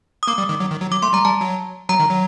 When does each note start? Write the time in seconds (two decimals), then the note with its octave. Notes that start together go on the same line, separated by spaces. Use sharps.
0.23 D#6
0.27 A#3 D6
0.38 G3
0.49 D#3
0.60 F#3
0.71 D#3
0.81 F#3
0.92 F#3 D6
1.02 A3 C6
1.13 G3 A#5
1.24 G3 A5
1.41 F#3
1.89 F#3 A#5
2.00 D#3
2.10 F#3